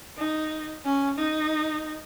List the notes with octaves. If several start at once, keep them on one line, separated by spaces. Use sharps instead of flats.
D#4
C#4
D#4